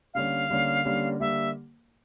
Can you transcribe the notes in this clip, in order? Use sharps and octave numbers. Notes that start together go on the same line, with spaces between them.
D3 G3 A#3 C#4 F5
D3 G3 A#3 C#4
D3 G3 A#3 C#4
D3 G3 A#3 E5